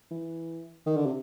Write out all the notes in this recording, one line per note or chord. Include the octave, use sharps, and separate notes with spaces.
E3
D#3
D3
C3